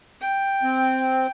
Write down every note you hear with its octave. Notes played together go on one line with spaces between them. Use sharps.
G5
C4